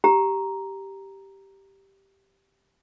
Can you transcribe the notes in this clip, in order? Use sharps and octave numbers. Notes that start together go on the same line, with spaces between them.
G4 A#5